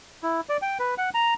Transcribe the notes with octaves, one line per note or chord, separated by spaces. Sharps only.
E4
D5
G5
B4
F#5
A#5